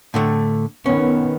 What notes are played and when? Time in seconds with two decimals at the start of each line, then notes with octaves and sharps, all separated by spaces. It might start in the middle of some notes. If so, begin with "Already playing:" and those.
0.14 A2 D3 A3
0.86 D#3 B3 C#4